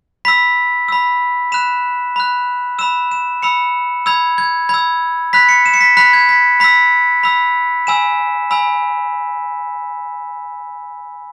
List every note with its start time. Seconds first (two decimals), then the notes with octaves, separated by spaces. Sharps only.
0.25 B5 E6 B6
0.88 B5 E6
1.52 B5 F#6 E7
2.16 B5 F#6
2.79 B5 E6 E7
3.11 E7
3.42 B5 E6 C#7
4.06 B5 E6 G#6
4.38 G#6
4.69 B5 E6 G#6
5.33 B5 F#6 B6
5.49 C#7
5.66 E7
5.74 C#7
5.81 B6
5.97 B5 F#6 B6
6.13 G#6
6.29 B6
6.60 B5 E6 B6
7.23 B5 E6
7.87 G#5 B5 E6 E7
8.51 G#5 B5 E6